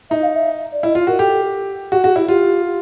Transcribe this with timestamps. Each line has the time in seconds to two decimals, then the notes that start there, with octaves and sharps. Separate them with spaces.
0.10 D#4 E5
0.22 F5
0.35 E5
0.72 D5
0.83 E4 D#5
0.95 F4
1.07 F#4 A#4
1.19 G4 A4
1.92 F#4 G4
2.04 F#4 G#4
2.16 E4 G4
2.28 F4 G4